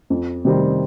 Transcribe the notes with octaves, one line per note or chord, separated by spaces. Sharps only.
F2
C3 D#3 G3 C4